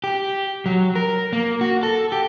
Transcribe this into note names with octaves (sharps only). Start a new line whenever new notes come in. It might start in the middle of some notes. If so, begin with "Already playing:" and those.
G4
F#3
A#4
A#3
F#4
A4
G4